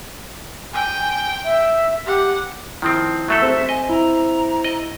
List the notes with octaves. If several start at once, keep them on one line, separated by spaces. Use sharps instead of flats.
G5 G#5
E5
G4 F#5
D#3 F3 C4 E4
F#3 A3 A4 E5
C4 C5
D#5 G#5
E4 A#5
D#5